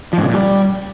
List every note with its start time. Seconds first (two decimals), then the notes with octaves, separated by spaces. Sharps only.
0.13 F3
0.18 G#2
0.23 C#3
0.29 A#2
0.34 G3